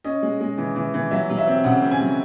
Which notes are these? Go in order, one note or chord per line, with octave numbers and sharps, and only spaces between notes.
C#4 D#5
G#3
G#3
E3
E3
E3
F#3 E5
F#3
E5
C4
C#3 F#5
C4
G#5
F#3